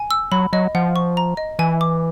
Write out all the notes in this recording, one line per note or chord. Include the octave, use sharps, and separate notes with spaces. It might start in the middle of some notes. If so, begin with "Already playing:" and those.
Already playing: G#5
E6
F#3 B5
F#3 D#5
F3 F#5
C#6
A#5
D#5
E3 G#5
D6